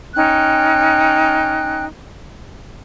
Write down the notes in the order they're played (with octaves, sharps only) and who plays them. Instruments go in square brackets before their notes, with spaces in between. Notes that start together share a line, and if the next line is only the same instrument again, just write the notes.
[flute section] C#4 D#4 G5 F#6